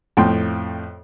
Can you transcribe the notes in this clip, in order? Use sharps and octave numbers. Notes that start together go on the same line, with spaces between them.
F2 A2 G5 C6